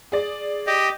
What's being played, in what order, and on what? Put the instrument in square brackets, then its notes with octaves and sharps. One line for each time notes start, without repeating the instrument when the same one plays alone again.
[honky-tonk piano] G#4 D5
[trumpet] G4 [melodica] D#5